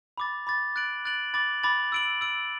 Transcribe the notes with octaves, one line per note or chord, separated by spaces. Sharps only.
B5 D6 A6
B5 D6 A6
F#6 A6 D7 F#7
F#6 A6 D7 F#7
B5 D6 A6 F#7
B5 D6 A6 F#7
E6 D7 F#7
E6 D7 F#7